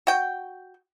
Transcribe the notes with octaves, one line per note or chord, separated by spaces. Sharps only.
F#4 G5